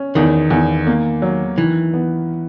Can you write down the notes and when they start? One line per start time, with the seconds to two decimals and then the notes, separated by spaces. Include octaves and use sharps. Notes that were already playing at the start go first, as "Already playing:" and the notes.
Already playing: C#4
0.15 E2 D#3
0.50 E2
0.87 A#3
1.22 F#3
1.58 D#3 E3
1.93 B3